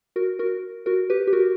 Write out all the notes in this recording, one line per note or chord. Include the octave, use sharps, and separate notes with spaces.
F#4 A#4
F#4 A#4
F#4 A#4
G4 B4
G4
F#4 A#4